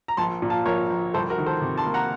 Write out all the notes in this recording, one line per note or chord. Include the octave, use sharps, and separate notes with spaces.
A#5
A#1 A5 C6
A#2
F5 A5
A#1 A#4 C#5
A#1
C2 A4 C5
F#4 A#4
D#3
A4 C5
C3
A5 C6
A#3
F#5 A#5